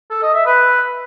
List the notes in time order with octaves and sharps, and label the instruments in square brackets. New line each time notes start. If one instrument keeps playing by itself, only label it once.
[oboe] A4
D#5
E5
B4